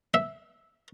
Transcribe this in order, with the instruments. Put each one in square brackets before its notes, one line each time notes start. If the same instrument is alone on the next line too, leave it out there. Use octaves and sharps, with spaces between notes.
[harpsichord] E5